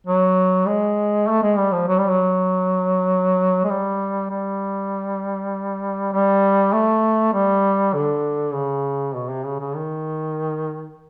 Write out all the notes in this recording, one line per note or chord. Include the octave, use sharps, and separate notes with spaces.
F#3
G#3
A3
G#3
G3
F3
F#3
G3
F#3
G#3
G3
G3
G3
A3
G3
D3
C#3
B2
C3
C#3
C#3
D#3